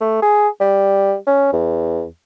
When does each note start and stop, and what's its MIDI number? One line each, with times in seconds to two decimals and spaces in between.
0.01 0.18 57
0.22 0.48 68
0.60 1.15 55
1.27 1.51 61
1.53 2.05 40